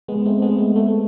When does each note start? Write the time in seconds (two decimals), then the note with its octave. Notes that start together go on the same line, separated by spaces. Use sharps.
0.08 G#3 B3
0.25 A3 C4
0.42 G#3 B3
0.58 A3
0.76 A3